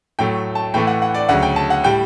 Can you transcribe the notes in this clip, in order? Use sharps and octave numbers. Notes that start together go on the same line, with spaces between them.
A2 F#3 A3 G5
A5
A2 E3 A3 G5
F#5
F#5
D5
D2 C#3 F#3 F#5
G5
A5
F#5
A2 G3 G5